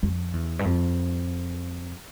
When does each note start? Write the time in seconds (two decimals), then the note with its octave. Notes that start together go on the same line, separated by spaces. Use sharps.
0.03 F2
0.34 E2
0.59 G2
0.65 F2